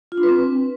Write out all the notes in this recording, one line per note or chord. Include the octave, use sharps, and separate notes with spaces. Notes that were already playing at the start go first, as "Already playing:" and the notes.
F4
D4
B4
C4